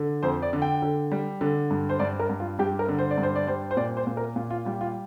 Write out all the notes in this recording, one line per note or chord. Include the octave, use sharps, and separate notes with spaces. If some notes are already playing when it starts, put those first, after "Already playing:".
Already playing: D3
F2 C5
D5
D3
G5
D3
G3
D3
G2
C5
G2 D5
A#4
G2
F4
G2 G4
A#4
D3
C5
D5
G2
C5
D5
G3 C5
C5
A#2 D5
C5
A#2
A#4
A#2 F4
F4
G3 F4
F4